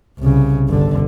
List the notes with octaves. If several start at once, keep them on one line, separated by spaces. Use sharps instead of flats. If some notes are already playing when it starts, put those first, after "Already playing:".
C2 C#3
G1 D3